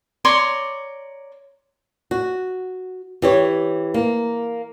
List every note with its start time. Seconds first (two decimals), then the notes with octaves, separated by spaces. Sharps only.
0.25 C#5 D5 A#5 C6
2.11 F#4
3.22 E3 G4 C#5
3.94 A#3